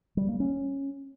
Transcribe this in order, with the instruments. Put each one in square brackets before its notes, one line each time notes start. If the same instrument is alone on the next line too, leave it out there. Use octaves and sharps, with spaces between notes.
[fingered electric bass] G3
A#3
C#4